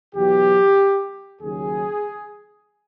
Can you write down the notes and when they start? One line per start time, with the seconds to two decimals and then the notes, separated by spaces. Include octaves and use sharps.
0.15 E2 B2 F#3 G4
1.42 D#2 C#3 F#3 G#4